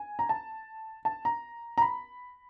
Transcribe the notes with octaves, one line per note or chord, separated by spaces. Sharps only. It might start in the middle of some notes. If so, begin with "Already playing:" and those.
Already playing: G#5
A#5
A5
A5
A#5
A#5
B5